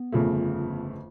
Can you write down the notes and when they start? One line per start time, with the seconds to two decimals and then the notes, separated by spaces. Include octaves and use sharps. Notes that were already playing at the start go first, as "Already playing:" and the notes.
Already playing: B3
0.12 G1 F2 C#3 F3 A3